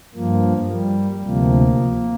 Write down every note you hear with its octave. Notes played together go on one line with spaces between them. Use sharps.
G2 F3 A#3
G3
D2 C3 F3 A#3